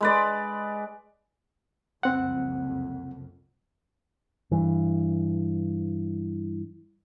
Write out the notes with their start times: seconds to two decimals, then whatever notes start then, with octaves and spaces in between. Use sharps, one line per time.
0.01 G#3 B4 D5
2.03 F#1 C2 F2 C4 F#5
4.51 G2 E3